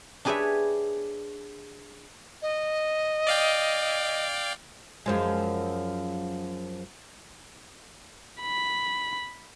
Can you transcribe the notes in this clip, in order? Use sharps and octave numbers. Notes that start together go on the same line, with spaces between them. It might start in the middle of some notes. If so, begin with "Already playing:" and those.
D4 G4 G#4 B4 C#5 E5
D#5
D5 F5 G5
F#2 F3 G#3
B5